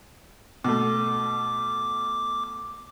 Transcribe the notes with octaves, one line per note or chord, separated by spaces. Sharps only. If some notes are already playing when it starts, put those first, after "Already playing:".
B2 A3 D6